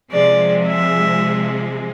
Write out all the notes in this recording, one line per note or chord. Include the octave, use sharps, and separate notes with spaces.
C3 F3 G#3 D5
E5